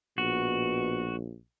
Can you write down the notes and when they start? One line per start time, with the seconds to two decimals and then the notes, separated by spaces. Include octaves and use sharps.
0.18 A#1 B2 F#4